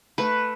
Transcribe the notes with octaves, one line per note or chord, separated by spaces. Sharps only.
A3 B4